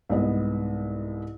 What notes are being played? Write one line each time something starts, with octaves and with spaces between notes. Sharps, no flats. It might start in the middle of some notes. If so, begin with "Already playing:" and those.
C2 G#2 B3 D#5